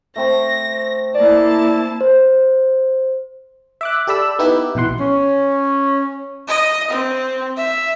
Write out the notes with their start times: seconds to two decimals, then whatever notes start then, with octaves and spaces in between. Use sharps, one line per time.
0.16 A3 C4 C5 A#6
1.15 A#3 E4 D5 A5
2.01 C5
3.81 E5 D6 F#6
4.07 G4 A4 D5 B5 E6
4.39 B3 D#4 E4 G4 B4
4.75 A#1 B2 E3 F#5 C6
5.00 C#4
6.48 D#5
6.91 C4
7.57 E5